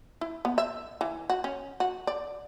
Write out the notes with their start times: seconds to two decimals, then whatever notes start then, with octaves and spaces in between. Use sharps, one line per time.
0.21 E4
0.45 B3
0.58 E5
1.01 E3
1.30 F#4
1.44 C#4
1.80 F#4
2.07 D5